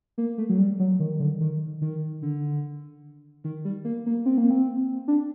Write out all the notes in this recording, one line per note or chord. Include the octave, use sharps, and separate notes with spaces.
A#3
A3
F#3
G3
F#3
D#3
D3
D#3
D#3
D3
D#3
G3
A#3
A#3
C4
A#3
C4
D4